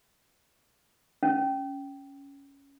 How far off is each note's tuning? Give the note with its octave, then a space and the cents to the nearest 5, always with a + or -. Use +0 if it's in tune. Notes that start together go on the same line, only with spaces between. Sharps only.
C#4 +5